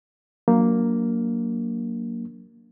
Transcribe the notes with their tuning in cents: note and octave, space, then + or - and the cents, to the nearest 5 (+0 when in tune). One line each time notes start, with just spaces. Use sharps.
F#3 +0 A#3 +0 D4 -20